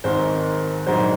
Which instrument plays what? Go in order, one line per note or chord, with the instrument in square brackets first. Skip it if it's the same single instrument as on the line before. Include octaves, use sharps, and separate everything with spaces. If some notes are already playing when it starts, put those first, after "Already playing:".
[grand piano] G#1 G#2 D#3 C5
A#1 G#2 F#3 C5